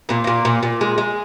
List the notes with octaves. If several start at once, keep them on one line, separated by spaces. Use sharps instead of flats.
A#2 A#3
A#2 A#3
A#2
A#2
G#3
G#3